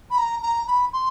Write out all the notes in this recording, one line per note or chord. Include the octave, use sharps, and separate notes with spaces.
B5
A#5
A#5
B5
C6